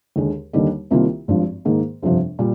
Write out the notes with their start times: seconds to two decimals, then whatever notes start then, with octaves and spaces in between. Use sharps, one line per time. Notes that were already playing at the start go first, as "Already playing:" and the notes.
0.16 D#2 D3 G#3
0.53 D#2 D3 G3 A#3 D#4
0.91 C2 C3 D#3 A#3 F4
1.28 G#1 G2 F3
1.65 G#2 D#3 A#3
2.02 G1 F2 C3 F3
2.39 A#2 G3